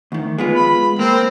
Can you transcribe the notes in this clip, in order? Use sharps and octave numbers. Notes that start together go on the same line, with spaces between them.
D2 D#3
G#3 B3 F4
B5
A#3 C4